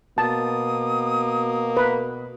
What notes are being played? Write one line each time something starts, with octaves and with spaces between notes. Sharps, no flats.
B2 A#3 A5 D#6
B4